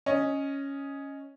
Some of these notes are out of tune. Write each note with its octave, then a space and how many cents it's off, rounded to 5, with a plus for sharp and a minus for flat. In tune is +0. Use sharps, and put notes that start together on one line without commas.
C#4 +0 D#5 +0